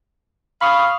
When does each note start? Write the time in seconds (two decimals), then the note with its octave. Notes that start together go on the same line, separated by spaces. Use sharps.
0.61 F5 B5 C#6 D#6